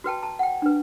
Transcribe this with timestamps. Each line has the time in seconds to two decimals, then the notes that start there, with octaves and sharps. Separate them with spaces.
0.04 F#4 B4 G5 A5
0.23 A5 A#5
0.39 F#5 G5
0.62 D4 B4